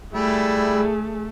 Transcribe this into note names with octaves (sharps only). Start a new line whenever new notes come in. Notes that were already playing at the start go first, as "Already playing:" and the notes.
G3 A3 E4 G#4 D5